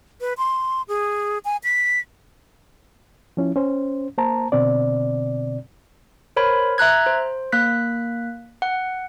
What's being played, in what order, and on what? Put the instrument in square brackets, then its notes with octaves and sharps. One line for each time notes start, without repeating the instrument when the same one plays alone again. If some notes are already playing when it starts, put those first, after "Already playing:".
[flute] B4
C6
G#4
G#5
B6
[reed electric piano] F3 C#4 E4
C#4 C5
A#3 C5 A5 A#5
B2 D3 C4 D5
[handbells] A#4 C5 C#5 B5
E5 A#5 F#6 G#6
C5
A#3 F#6 B6
F#5